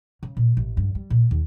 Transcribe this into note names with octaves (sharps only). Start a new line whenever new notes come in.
C#3
A#2
A1
G2
G3
A#2
D#2